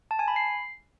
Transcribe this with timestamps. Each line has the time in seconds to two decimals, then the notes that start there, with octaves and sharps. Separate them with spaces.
0.11 A5
0.19 G#5
0.28 B5
0.36 C7